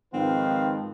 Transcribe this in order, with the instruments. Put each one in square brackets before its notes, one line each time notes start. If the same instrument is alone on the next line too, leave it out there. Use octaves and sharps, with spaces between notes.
[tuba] G#2 [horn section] D#3 F3 [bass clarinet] C4 [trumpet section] B4 F5